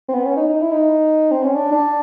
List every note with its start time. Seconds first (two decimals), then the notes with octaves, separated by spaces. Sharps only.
0.09 C4
0.14 B3
0.25 C#4
0.37 D#4
0.49 D#4
0.61 E4
0.72 D#4
1.31 C4
1.43 C#4
1.55 D4
1.72 D4